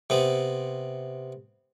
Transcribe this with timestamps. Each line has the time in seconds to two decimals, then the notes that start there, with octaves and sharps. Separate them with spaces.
0.10 C3 B3